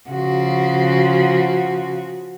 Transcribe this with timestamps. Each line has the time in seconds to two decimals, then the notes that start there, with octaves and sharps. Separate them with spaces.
0.10 C#3 F3 F#4